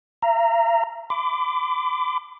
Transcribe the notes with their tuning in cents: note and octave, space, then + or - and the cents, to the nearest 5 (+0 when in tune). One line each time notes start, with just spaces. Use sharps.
E5 +45 A#5 -10
B5 +45 D6 +0